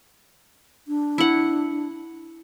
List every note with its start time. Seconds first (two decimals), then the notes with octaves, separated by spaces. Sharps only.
0.88 D4
1.18 E4 F#5